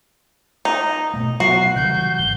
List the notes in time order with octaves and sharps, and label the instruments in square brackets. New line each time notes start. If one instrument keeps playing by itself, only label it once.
[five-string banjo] D#4
[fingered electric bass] B2 A3
[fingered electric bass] F#3 B3 [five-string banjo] F#4 [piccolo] C7
[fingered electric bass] C#3 E3 G3 [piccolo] G6
[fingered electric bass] G#1 [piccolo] G7